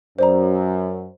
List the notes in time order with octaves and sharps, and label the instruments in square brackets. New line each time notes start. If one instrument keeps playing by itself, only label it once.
[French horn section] F#2 [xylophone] C5 D5 A#5